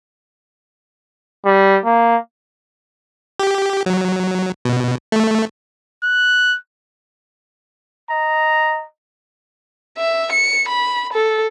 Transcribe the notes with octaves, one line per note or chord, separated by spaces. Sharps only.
G3
A#3
G4
F#3
B2
A3
F#6
D#5 A#5
E5
C#7
B5
A4